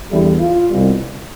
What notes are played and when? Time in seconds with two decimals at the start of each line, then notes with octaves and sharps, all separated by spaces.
0.11 E2 D3 G3 E4
0.40 F4
0.69 C2 B2 G3